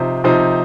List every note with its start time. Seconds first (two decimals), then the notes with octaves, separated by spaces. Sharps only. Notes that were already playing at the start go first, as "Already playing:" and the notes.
Already playing: C3 F3 D#4 C5
0.24 C3 F3 D#4 C5